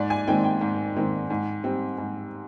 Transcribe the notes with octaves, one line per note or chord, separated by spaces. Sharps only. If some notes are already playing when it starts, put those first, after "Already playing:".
Already playing: G#2 D5
G#5
D#3 G#3 C4 G5
G5
G#2
D#3 G#3 C4
G#2
G3 C4
G#2